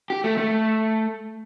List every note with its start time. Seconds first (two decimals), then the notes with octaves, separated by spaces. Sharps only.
0.10 G4
0.24 A3
0.37 A3